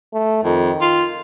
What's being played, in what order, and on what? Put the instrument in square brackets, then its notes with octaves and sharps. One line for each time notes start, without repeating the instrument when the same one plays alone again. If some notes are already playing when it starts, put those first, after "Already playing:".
[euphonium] A3
[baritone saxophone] F2 [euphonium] D#3
[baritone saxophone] F4